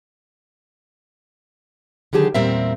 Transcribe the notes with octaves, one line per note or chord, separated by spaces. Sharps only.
D3 D#3 F#3 G4 G#4 A5
E2 A#2 G3 C4 A#4 E5